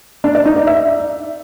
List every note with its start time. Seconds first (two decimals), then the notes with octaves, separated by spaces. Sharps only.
0.24 D4
0.35 D5
0.45 D#4
0.56 D5
0.67 E5